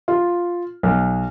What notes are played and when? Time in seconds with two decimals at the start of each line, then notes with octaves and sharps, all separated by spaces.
0.08 F4
0.83 B1